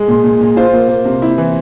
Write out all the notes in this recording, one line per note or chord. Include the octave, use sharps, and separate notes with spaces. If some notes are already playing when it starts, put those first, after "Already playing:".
Already playing: G#3
A#2
A#2
A#2
F4 C5
A#3
A#3
C3
E4
E3